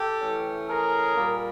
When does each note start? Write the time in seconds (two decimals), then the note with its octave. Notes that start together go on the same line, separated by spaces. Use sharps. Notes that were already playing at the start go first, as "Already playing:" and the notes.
Already playing: G4 A4
0.21 E3 A3 C#4
0.69 G#4 A#4
1.16 A#2 G3 A#3